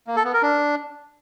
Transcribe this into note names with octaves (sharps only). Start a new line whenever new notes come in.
A#3
A4
B3
A#4
D4